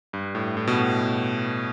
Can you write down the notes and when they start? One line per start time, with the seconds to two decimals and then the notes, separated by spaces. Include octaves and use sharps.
0.13 G2
0.35 A2
0.57 A2
0.67 B2
0.79 A2